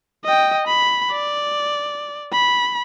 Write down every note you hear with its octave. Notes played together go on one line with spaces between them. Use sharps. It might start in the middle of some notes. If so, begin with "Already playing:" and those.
D#5 G5
B5
D5
B5